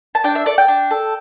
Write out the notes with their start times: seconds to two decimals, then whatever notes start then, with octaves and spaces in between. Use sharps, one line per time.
0.15 A5
0.24 D4 G5
0.35 E5
0.46 A4 D5
0.58 G5
0.68 D4
0.91 A4